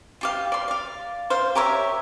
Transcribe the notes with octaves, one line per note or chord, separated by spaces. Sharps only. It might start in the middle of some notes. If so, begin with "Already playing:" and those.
F4 G4 F5
D5 C6
D5 F5
C5 F5
G4 A#4 C#5 E5